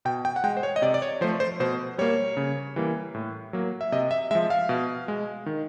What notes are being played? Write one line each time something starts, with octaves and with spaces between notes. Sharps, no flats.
B2 G5
G5
F#5
G#3 G5
C5
C#5
D#5
C3 D5
D5
C#5
F3 A3 C5
C5
B2 C5
G3 A#3 C#5
C#3
E3 G3 A#3
A2
F#3 A#3
E5
C3 D#5
E5
F3 G#3 E5
F5
B2
G#3
D#3